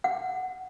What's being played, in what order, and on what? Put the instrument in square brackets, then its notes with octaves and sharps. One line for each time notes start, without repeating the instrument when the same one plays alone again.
[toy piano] F#5